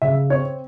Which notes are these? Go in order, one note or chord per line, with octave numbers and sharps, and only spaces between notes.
C#3 E5
C4 C#5